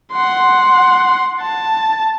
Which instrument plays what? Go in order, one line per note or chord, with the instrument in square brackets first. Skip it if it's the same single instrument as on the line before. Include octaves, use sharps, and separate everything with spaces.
[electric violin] F#5 C6
A5